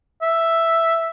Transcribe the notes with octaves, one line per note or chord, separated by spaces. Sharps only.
E5